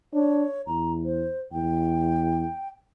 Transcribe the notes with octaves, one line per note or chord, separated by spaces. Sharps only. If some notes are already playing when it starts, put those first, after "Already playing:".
D4 C#5
E2 A#5
C5
E2 G5